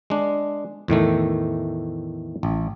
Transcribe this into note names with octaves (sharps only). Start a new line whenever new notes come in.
G#3 D4
E2 A2 D#3 A3
A1